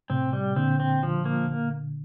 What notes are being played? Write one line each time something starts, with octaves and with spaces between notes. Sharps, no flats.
A2 C3 C4
G3
A#2 D3 C4
C4
F3
A#3